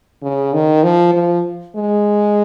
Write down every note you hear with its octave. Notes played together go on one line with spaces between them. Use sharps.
C#3
D#3
F3
F3
G#3